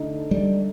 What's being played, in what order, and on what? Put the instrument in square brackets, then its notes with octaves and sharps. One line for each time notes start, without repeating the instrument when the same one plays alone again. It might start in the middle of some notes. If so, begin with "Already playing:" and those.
Already playing: [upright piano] D3 A3 D#4
[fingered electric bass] G3